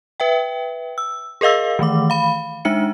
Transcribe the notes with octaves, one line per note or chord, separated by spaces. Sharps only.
B4 E5 G5
E6
G#4 A#4 D#5 F5 E6
D#3 E3 A3 D6
F5 B5
G#3 D4 D#4 E5 C#7